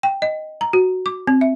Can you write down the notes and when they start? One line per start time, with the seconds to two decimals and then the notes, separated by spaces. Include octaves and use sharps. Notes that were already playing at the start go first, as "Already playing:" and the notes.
0.03 G5
0.22 D#5
0.61 A#5
0.73 F#4
1.06 D6
1.27 C4
1.41 E5